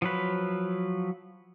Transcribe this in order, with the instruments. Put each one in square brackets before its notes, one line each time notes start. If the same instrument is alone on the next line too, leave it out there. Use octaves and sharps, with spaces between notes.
[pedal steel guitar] F3 F#3 B4